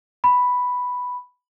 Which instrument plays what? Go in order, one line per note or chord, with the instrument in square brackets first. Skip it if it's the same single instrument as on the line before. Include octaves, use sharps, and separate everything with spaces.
[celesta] B5